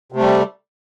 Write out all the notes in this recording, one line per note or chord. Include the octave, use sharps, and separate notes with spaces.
C3 G3 A3